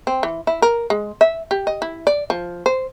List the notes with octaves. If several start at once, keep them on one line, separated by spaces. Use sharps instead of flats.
C4
E3
E4
A#4
G#3
E5
G4
D#5
E4
D5
F3
C5